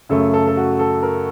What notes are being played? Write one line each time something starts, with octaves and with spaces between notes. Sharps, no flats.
F#2 C#3 A3 A4
A4
A4
F#4
A4
A#4